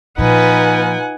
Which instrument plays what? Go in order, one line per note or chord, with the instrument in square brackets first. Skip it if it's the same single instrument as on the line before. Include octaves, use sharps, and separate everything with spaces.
[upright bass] A#2 F3 [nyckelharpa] D#4 F4 [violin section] B4 [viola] F#5 G#5